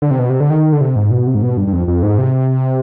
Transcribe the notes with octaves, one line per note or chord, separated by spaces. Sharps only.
D3
C3
B2
C3
D3
D#3
D3
C3
G#2
B2
C3
G#2
B2
G2
G2
F2
F2
G#2
C3